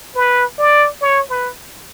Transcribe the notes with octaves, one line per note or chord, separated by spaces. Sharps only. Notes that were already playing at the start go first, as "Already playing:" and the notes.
B4
D5
C#5
B4